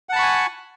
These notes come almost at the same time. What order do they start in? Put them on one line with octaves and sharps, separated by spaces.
F#5 A5 B5 C#6 G#5